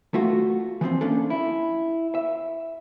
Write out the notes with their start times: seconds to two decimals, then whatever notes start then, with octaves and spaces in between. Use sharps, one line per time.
0.14 A3 F4 F#4
0.81 E3 F3 A3 C4
1.01 A#3 C#4 D4 A4
1.30 E4
2.15 E5